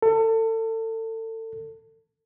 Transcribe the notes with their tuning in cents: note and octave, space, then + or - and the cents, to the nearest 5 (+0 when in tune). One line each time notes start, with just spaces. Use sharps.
A4 +30